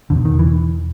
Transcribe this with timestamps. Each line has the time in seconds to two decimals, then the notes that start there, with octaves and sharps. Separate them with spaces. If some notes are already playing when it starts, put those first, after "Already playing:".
0.10 E2 D3
0.16 B2
0.25 D#3
0.39 E3